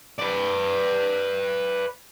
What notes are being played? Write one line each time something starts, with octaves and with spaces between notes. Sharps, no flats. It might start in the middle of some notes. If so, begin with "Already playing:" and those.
B4 D5